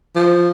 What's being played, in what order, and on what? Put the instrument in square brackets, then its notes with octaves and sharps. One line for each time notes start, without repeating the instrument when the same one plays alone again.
[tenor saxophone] F3